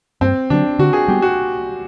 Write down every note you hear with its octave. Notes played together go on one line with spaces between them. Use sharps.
G2 C4
D3 F#3 D4
D3 F#4
G#4
G3 B3 G4
F#4